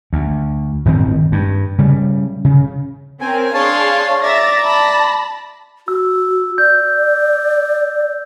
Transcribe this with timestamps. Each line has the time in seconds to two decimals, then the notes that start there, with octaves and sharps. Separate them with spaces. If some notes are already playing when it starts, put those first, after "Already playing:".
0.13 D2
0.85 D1 G1 D#3 C4
1.32 G2
1.78 C#3 G3
2.45 C#3
3.21 C4 C#4 A#4 G#5
3.54 D4 G#4 C#5 F5 A5 C6
4.23 D5 E5 A#5 A6 A#6
4.65 A5 B5 A#6
5.88 F#4 E6
6.58 D5 G6